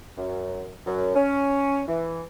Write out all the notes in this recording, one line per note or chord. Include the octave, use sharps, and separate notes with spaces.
F#2
F#2
C#4
E3